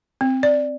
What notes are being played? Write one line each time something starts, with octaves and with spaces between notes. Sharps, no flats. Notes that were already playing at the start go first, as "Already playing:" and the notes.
C4
D5